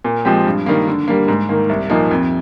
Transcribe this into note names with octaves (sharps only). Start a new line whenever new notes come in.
A#2
F3 G#3 C4 G4
G2
D#3 G3 A#3
D3
G3 A#3
G#2
D#3 A#3
C2
A#2 F3 A#3 D#4
F2